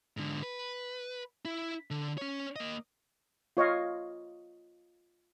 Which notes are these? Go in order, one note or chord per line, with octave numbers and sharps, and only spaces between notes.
G#2 D3
B4
E4
D3
C#4 C#5
A#3 D#5
F4 C#5 D#5 F5